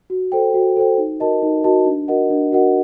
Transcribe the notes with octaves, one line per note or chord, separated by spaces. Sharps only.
F#4
A4 C5 G5
F#4
A4 C5 G5
D#4
F#4 A#4 D#5 A5
D#4
F#4 A#4 D#5 A5
D4
F#4 A#4 D#5 F#5
D4
F#4 A#4 D#5 F#5